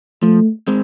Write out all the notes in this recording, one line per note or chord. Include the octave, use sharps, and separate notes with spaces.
F3 A3
G#3 C4